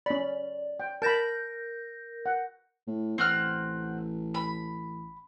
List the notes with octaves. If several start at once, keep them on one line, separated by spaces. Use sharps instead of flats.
C#4 D5 B5
G5
A#4 A5 B5 G6 A#6
F#5
A2
A1 C4 F#5 F6
B5